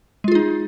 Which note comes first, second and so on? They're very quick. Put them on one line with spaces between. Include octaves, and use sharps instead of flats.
G#3 F4 G#4 D#4